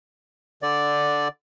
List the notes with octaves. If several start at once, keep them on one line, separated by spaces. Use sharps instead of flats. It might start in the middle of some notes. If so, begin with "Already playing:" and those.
D3 D5